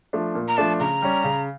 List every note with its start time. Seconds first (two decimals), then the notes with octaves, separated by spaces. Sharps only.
0.13 F3 A3 D4
0.35 A#2
0.48 A#5
0.57 F3 A3 D4 A5
0.80 C#3 A#5
1.02 G3 C#4
1.24 C#3